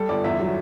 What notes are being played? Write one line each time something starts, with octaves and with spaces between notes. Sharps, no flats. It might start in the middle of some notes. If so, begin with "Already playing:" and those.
Already playing: G3 A4
G1 D5
E2 E5
F#3